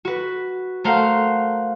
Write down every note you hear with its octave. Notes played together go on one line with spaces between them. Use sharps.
F#4 B4
A3 A#4 C5 F5 F#5